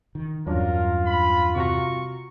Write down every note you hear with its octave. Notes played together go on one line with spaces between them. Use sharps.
D#3
E2 G2 F#3 C#4 D4 F4 A#4
B5
C3 F#4 A#5 C#6